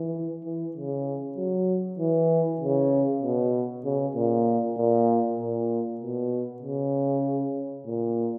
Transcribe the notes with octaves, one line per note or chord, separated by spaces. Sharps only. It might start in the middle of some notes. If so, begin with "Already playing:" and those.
Already playing: E3
E3
C#3
F#3
E3
C#3
B2
C#3
A#2
A#2
A#2
B2
C#3
A#2